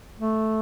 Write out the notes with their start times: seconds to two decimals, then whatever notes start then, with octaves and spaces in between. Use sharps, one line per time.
0.20 A3